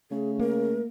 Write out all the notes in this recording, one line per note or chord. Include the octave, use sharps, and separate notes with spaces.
C#3 A3 G#4
A#3 A#4